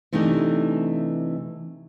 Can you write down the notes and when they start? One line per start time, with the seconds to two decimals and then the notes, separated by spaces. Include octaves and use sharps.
0.13 C3 E3 A3 D4 D#4